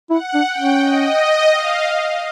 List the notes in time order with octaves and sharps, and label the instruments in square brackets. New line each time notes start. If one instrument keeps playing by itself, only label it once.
[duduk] E4 [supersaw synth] F#5
[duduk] D4
[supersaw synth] G5
[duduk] C#4
[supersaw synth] D#5
F5